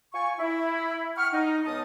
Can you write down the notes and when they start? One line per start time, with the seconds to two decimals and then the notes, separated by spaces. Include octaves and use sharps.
0.14 F4 G#5 C#6
0.39 E4
1.17 F#5 G5 C#6 F6
1.33 D#4
1.66 C#2 B3 A5 D#6